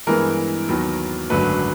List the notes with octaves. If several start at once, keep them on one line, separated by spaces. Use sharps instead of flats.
G2 E3 G#3 B3 A#4
D#2 D#3 F#3 B3
G#1 F#2 D3 F#3 A3 B4